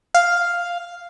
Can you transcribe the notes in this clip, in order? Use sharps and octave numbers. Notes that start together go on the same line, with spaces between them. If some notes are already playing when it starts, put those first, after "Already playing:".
F5